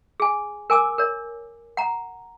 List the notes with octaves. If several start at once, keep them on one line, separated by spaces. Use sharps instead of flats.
G#4 G#5
A#4 G#5 D6 E6
A#4 C#5
F#5 A#5